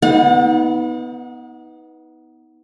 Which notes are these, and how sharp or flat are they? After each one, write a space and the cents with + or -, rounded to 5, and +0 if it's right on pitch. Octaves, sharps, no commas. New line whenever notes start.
B3 +0 D#4 +35 F#5 -40